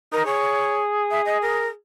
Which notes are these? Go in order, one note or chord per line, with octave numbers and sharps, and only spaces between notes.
D#4 A#4
G#4 C#5
E5
D#5
A#4